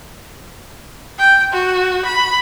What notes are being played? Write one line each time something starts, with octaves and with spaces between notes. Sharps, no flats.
G5
F#4
B5